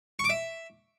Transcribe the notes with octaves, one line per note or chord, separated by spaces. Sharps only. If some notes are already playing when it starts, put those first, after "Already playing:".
C#6
D6
E5